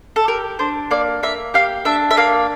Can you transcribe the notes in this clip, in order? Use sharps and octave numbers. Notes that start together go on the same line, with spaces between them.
A4
G4 A#4
D4 C5
A#3 D5
A#3 E5
G4 F5
D4 E5
E5
A#3 F5